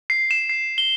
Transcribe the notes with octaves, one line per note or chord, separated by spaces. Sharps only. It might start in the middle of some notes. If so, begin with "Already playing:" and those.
C7
E7
C7
G7